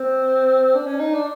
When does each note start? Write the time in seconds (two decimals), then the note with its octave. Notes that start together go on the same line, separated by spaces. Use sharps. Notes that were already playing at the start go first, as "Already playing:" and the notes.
Already playing: C4
0.75 D4
0.87 C#4
1.00 D#4
1.14 D4